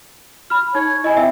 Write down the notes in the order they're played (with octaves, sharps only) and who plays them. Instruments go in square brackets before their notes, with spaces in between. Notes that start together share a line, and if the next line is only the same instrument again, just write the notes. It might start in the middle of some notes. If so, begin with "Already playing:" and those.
[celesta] B5 F6
[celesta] D#4 [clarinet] C#5
[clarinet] E4 [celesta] D#5 G#5
[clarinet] C4 [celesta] E5